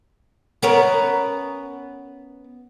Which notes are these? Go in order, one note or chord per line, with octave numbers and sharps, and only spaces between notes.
B3 C#4 A#4